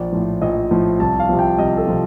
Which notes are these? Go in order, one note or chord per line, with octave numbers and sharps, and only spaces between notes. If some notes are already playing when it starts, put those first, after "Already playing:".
Already playing: A#1 D5
A2 F3
A#1 D#5
A2 F3
C2 A5
F5
C3 F3
G5
C2 D#5
A4
C3 F3